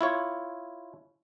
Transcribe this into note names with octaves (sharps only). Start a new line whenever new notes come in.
E4 F4 C#5